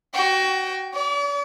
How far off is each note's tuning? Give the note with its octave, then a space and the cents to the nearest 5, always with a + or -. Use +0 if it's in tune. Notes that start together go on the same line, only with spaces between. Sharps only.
F#4 +25 G5 +0
D5 -45 D6 -15